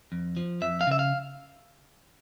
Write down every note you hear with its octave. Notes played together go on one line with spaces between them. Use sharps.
F2
F3
F2 E5
F5
C#3 E5
F5